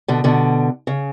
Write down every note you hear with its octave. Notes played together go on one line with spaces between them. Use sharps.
B2 D3
B2 D3
C#3